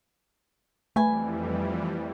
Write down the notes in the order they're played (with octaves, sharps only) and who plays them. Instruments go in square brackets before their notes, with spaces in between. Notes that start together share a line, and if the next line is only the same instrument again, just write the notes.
[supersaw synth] F2 E3 G3 [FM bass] A3 [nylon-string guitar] B4 G#5